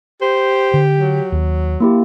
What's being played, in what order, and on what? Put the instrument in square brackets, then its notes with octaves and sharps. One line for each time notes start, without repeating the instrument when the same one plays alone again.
[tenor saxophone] G4 [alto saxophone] C5
[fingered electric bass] D3
[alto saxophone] F#3
[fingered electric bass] D#2
[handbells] A#3 E4 G4